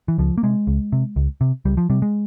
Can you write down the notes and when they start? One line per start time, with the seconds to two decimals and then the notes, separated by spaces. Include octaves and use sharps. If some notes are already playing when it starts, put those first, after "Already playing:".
0.08 E3
0.18 C#2 F3
0.38 A#3
0.43 C3 G#3
0.67 C#2
0.92 C3
1.16 C#2
1.41 C3
1.65 C#2 G3
1.77 F3
1.90 C3 G3
2.02 G#3